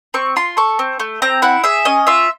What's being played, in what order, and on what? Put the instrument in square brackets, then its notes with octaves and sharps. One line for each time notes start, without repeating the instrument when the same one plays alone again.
[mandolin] C4 C#6
F4 C6
A4 C#6
C4
A3
C4 A#5
E4 F#5
G#4 E5
C#4 D#5
F4 E5